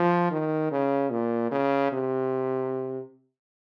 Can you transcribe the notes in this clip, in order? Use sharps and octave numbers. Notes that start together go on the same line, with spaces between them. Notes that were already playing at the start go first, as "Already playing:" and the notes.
Already playing: F3
D#3
C#3
A#2
C#3
C3